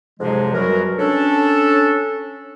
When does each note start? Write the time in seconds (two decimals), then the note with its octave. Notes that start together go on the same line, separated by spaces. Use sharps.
0.20 F2 G#2 C3 F3 F#3 G#3
0.54 F#2 B2 F#3 G3 F#4 A#4
0.98 C#4 D4 A4